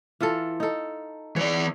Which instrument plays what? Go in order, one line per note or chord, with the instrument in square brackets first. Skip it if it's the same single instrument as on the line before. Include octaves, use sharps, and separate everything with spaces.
[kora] E3 F4 A4
D#4 A4
[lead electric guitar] E3 D5 [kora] C#5